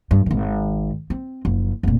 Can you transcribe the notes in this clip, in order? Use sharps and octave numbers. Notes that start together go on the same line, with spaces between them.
G2
G#1 D#3
C4
F#1 F3
F1 A#2